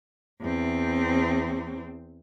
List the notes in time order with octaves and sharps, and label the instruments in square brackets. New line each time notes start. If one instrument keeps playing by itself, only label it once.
[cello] E2 C4